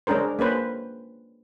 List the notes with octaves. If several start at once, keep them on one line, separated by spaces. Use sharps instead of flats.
G#3 C#4 D4 A#4 C5
A#3 C#4 B4 C5